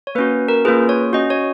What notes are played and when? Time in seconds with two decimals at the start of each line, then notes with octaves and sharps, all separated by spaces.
0.07 C#5
0.15 A#3 B4
0.18 C#4 F#4
0.48 A#4
0.65 A#3 C#4 F4 G#4 B4
0.89 C#5
1.13 C#4 F#4 D#5
1.30 C#5